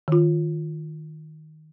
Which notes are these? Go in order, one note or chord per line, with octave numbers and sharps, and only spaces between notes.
D#3 F4